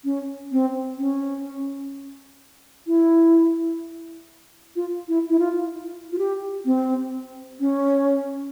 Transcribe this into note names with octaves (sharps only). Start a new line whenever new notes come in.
C#4
C4
C#4
E4
F4
E4
E4
F4
F4
G4
C4
C#4